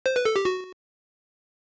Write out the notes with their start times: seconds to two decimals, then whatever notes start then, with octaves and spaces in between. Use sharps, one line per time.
0.06 C5
0.16 B4
0.25 A4
0.36 G4
0.45 F#4